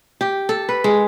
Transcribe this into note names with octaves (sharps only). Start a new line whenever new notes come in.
G4
A4
B4
G#3